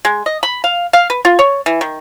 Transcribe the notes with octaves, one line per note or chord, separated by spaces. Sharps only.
G#3
D#5
B5
F5
F5
B4
F4
C#5
E3
D#3